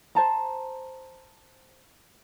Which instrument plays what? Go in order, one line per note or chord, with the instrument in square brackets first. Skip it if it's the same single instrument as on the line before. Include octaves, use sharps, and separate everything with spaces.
[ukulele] C5 A5 A#5